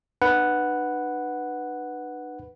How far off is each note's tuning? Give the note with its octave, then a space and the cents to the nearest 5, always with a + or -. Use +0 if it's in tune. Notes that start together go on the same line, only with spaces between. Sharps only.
D4 +45 B4 +0 F#5 +0